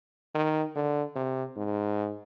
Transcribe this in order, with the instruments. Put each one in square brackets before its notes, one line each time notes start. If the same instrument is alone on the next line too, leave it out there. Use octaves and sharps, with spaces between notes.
[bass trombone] D#3
D3
C3
G#2